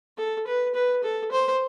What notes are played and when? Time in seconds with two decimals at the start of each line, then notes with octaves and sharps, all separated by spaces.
0.18 A4
0.47 B4
0.74 B4
1.03 A4
1.31 C5